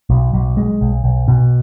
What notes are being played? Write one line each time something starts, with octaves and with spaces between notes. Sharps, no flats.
B1
B1
G#3
B1
B1
B2